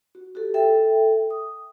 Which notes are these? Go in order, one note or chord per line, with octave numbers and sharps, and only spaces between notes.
F#4
F#4 G4 A4
A4 E5 G5
D#6